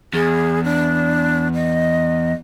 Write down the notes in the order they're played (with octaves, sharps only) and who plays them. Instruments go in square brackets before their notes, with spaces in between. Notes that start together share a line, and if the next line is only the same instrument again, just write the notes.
[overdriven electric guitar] E2 [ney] G#4
[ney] D4
D#5